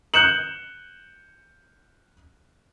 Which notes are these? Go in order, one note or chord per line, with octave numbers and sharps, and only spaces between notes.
F#6 G6 C#7 E7 F#7